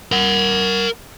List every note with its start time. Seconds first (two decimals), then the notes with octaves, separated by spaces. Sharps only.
0.12 A#4 F#5